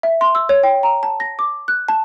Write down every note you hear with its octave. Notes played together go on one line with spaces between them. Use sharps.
E5
C6
E6
C#5
G5
A#5
A5
A#6
D6
F#6
A5